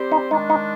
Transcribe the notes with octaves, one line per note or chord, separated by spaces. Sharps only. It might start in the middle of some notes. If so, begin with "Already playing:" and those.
Already playing: G3 C4 G4 C5
D#4
D#3 G#3 D4 D#4
D#4